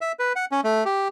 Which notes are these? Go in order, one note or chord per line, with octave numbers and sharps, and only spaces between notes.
E5
B4
F#5
C#4
A3
G4